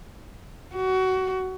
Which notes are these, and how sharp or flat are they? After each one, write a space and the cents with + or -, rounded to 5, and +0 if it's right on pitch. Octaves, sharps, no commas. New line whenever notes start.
F#4 +20